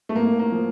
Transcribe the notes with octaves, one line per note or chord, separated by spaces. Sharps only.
A3
A2 A#3
A#3
F3